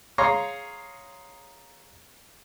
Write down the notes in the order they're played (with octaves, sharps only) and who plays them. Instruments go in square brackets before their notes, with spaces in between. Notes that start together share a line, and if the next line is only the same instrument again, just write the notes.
[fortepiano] G#4 C#5 F5 A#5 C6 C#6